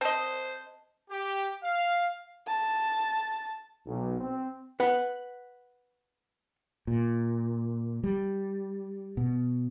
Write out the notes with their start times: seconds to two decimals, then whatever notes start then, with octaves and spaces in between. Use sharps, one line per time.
0.01 C4 C5 D#5 A5
1.11 G4
1.63 F5
2.47 A5
3.86 B1
4.20 C4
4.80 B4 F#5
6.87 A#2
8.04 G3
9.17 B2